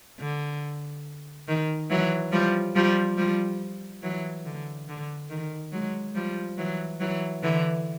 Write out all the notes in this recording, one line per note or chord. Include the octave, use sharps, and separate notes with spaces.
D3
D#3
E3 F#3
F3 G3
F3 G3
F3 G3
E3 F#3
D3
D3
D#3
F#3 G#3
F3 G3
E3 F#3
E3 F#3
D3 E3